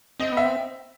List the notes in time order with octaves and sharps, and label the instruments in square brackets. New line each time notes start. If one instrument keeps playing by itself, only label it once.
[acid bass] C4 [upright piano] D#5
[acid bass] B3
[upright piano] E5
[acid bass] C4